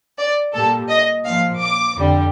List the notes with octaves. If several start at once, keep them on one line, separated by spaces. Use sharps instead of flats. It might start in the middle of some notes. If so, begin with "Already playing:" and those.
D5
A#2 G3 A4
D#5
A#2 F3 F5
D6
F2 D3 G3